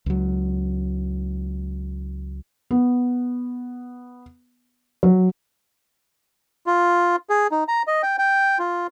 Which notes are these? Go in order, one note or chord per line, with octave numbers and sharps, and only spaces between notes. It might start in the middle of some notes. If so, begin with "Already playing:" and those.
C#2 F#3
B3
F#3
F4
G#4
D#4
A#5
D#5
G5
G5
F4